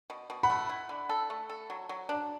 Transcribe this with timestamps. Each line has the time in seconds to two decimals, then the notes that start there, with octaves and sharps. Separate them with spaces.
0.10 B2
0.30 B2
0.43 F#5 B5
0.50 A3
0.69 E4
0.89 D3
1.09 A4
1.30 A3
1.49 A4
1.70 F#3
1.89 F#3
2.09 D4